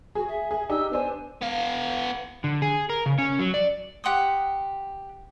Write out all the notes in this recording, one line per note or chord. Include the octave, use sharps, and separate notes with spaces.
F#4 G#4
E5
G#4 E5
D4 D#4 G4 E6
B3 D4 C5 G#5
B3 F5
D3
G#4
A#4
C#3
C#4
F#3
D5
G4 F#5 C6 D#6